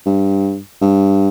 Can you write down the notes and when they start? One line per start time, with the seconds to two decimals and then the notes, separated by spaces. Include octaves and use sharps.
0.06 G2
0.82 G2